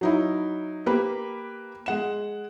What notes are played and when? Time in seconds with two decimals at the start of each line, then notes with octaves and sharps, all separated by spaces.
0.01 F#3 D#4 E4
0.86 A#3 G4 B4
1.86 G#3 F#5 E7